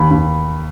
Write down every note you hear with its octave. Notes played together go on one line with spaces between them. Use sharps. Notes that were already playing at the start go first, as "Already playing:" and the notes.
Already playing: D#2 B5
D#2